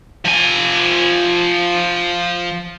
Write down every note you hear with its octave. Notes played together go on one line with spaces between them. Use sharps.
F3 G#5